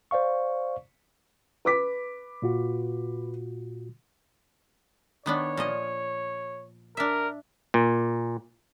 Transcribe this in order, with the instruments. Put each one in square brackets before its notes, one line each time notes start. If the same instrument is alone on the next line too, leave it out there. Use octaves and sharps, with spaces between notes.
[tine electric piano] C5 D5 F5 C#6
[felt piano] B4 D6 B6
[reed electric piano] A#2 F4 F#4
[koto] D#3 B3 D4 [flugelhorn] C#5
[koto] A#2 F3 D#5
[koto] D4 E5 [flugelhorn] A#4
[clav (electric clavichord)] A#2